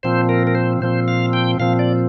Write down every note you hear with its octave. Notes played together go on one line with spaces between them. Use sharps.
A#2 F3 C4 C5
A#4
A#4
C5
A#2 F3 C4 C5
F5
G5
A#2 F3 C4 F5
D5